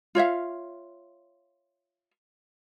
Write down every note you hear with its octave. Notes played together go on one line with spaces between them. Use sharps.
F4 C#5 E5 F5